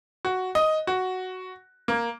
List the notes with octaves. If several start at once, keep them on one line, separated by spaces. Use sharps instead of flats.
F#4
D#5
F#4
A#3